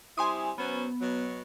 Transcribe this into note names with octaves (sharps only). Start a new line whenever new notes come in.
G3 C4 E4 G#5 C6 D#6
F#3 B3 C#4 C5
B2 F#3